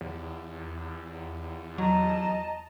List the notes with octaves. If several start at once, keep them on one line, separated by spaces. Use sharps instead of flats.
E2
F#3 D#5 A5 A#5